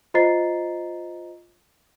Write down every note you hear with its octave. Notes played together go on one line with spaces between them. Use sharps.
F4 C5 D#5 A#5 A6 C7